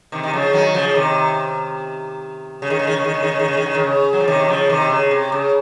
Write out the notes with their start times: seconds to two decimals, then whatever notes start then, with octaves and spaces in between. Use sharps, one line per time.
0.12 C3 D#3
0.23 D#3
0.33 C#3 F3
0.53 D#3 F#3
0.74 C#3 F3
0.95 C3 D#3
2.62 C#3
2.70 D#3
2.79 C#3
2.87 D#3
2.96 C#3
3.05 D#3
3.14 C#3
3.23 D#3
3.31 C#3
3.40 D#3
3.48 C#3
3.57 D#3
3.66 C#3
3.75 D#3
3.84 C#3
4.13 F#3
4.20 F3
4.28 C3 D#3
4.48 C#3 F3
4.69 C3 D#3
4.90 C#3
5.11 C3
5.32 C#3